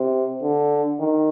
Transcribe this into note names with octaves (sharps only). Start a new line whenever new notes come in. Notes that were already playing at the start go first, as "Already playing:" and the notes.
Already playing: C3
D3
D#3